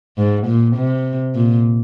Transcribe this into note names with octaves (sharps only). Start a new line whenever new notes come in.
G#2
A#2
C3
A#2